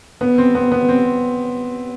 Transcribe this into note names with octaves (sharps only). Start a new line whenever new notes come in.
B3
C4
B3
B3
C4